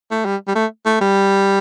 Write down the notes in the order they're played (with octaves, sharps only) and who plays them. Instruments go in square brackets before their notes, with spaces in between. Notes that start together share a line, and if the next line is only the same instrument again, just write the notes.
[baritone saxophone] A3
G3
G3
A3
A3
G3